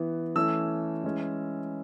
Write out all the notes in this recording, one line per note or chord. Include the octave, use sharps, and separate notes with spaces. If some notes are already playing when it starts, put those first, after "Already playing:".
Already playing: E3 B3
E3 A3 C#4 E6
E3 G#3 C#4